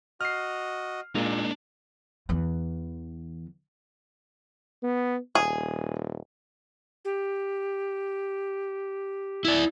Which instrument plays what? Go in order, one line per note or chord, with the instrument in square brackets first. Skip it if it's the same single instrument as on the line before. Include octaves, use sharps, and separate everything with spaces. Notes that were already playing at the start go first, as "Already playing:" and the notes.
[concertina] F#4 D#5 [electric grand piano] F6 C7
[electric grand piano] A#2 [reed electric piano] G#3 A#3 [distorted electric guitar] D4 D#4
[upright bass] E2 E3
[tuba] B3
[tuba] D#1 [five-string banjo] G#4
[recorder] G4
[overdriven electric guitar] E4 D5